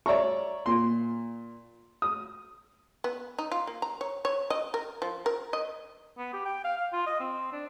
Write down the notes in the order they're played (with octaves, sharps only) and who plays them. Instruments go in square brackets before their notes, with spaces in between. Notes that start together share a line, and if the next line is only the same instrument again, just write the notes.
[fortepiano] C#5 D5 E5 A#5 C#6
A#2 C6
D#6
[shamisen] B3
D#4
F4
A#3
A#5
C#5
C#5
D#5
A#4
F3
A#4
D#5
[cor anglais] B3
G4
G5
F5
F5
F4
D#5
C4
D4